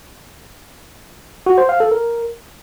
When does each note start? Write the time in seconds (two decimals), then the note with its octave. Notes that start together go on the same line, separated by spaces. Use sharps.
1.46 F#4
1.58 C5
1.69 F5
1.80 A4
1.91 A#4